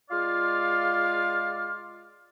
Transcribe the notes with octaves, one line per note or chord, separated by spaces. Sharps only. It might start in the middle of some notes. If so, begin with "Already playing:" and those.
G#3 F4 D5 F5 F6